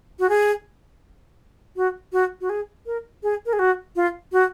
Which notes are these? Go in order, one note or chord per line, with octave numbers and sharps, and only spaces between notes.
F#4
G#4
F#4
F#4
F#4
G#4
A#4
G#4
A#4
G#4
F#4
F4
F#4